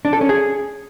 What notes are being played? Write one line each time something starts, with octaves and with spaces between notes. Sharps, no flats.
D4
A4
C#4
G#4